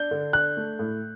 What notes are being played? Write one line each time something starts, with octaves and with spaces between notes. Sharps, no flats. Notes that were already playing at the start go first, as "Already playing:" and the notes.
Already playing: D4 G6
D3
D4 F#6
A3
A2